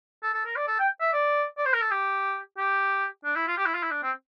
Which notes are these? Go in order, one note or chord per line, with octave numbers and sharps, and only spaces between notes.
A4
A4
A#4
D5
A4
G5
E5
D5
D5
C5
A#4
A4
G4
G4
D4
E4
F4
G4
E4
F4
E4
D4
C4